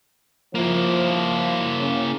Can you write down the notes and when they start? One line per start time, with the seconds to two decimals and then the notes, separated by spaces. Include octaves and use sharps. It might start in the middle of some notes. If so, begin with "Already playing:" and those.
0.55 F3 A#3 E4
1.78 C#3 C#4